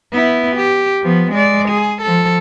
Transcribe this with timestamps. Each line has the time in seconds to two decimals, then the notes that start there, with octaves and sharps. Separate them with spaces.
0.12 B3 E4
0.56 G4
1.02 F3 B3
1.32 G#3 D5
1.69 G#4
2.02 F3 A4